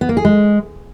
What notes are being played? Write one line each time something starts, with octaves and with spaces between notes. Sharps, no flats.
B3
A#3
G#4
G#3